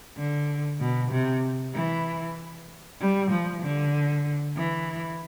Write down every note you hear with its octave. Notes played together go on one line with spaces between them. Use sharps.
D3
B2
C3
E3
G3
F3
D3
E3